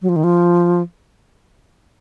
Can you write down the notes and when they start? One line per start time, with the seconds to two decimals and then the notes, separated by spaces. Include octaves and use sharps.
0.02 F#3
0.09 F3
0.16 D#3
0.24 F3